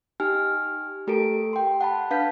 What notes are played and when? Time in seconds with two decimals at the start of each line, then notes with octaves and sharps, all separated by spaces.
0.20 D#4 G4 G#5 F6
1.07 A3 G4 A4 A#4 D7
1.53 G5 C6
1.81 F#5 A5 B5
2.11 D4 B4 F5 A5 G6 B6